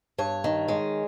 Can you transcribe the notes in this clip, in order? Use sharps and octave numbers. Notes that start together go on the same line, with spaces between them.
G2 C#5
D#3
G#3